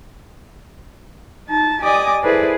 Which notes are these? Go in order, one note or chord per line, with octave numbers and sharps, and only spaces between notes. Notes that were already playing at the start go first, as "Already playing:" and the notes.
D#4 A5
G4 D5 D#5 G#5 D6 D#6
E4 G#4 A4 B4 C5 D5